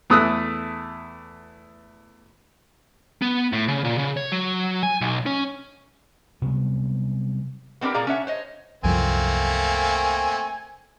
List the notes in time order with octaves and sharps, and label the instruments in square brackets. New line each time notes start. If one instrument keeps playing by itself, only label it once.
[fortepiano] E2 A3 D#6 E6 F#6
[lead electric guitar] B3
A2
C#3
A#2
C#3
C#5
F#3
G#5
B1
C#4
[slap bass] C3 F#3 G3 B3
[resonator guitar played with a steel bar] B3 C4 D4 G4 A#4
A#2 A#3 G#4 D5 F5 A#5
C#4 D4 C#5 E5 F#5
C5 C#5 D#5
[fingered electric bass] C2 F#2 F3 [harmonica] A3 A#3 C4 [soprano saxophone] G#5